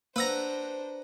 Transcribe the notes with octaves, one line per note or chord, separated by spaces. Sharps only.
A#3 D4 B4 C5 F#5 A#5 E6 A#6